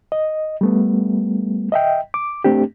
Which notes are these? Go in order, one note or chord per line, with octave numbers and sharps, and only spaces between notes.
D#5
G3 A3 B3
D#5 E5 G5
D6
A3 C4 D4 G4